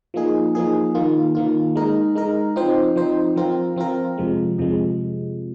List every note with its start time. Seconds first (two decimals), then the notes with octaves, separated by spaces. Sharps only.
0.14 F3 A#3 D#4 G#4
0.55 F3 A#3 D#4 G#4
0.95 D#3 A#3 F4
1.35 D#3 A#3 F4
1.75 G#3 D#4 A#4
2.15 G#3 D#4 A#4
2.56 F3 C4 D#4 C5
2.96 F3 C4 D#4 C5
3.36 F3 C4 F4 A#4
3.76 F3 C4 F4 A#4
4.18 F2 C3 F3 G#3
4.58 F2 C3 F3 G#3